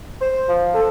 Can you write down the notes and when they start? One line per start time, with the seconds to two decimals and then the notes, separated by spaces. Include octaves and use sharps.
0.21 C5
0.47 F3
0.74 A4